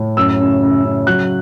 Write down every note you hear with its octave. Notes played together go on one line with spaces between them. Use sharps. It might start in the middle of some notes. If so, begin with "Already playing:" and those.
Already playing: A2
F#2 E6
C#3
C#3
C#3
F#3 F#6